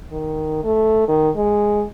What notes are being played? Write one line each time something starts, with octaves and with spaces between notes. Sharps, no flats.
D#3
A3
D#3
G#3